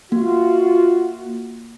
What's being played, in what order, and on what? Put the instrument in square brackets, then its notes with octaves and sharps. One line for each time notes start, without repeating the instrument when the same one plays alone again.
[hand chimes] A#3 [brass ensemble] F4 F#4